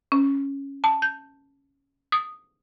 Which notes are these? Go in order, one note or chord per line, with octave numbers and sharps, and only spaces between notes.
C#4
A5
G6
D#6